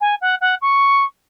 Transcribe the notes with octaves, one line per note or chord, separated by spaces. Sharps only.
G#5
F#5
F#5
C#6